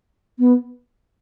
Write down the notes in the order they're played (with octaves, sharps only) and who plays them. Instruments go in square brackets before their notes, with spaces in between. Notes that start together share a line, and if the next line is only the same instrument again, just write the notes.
[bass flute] B3